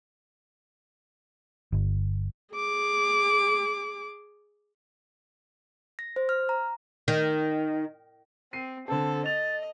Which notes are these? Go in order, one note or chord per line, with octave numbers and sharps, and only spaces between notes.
G1
G#4 D6
A#6
C5
F6
A#5
D#3
C4 C7 D#7
D3 C4 A4 A5
D#5 A6 F7